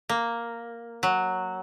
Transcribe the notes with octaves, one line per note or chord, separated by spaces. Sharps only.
A#3
F#3